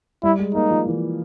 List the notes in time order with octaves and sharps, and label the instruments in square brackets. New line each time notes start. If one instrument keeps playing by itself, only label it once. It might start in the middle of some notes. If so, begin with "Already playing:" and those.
[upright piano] G3 [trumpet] E4
[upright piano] G#3
[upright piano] A#3 [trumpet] D#4
[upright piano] F3
E3